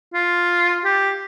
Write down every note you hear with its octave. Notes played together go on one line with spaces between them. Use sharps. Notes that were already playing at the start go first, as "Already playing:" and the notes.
F4
G4